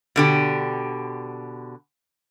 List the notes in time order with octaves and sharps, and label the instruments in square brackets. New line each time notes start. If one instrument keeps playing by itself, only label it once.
[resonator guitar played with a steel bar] B2 D3 G4